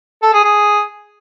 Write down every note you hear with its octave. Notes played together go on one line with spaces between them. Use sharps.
A4
G#4
G#4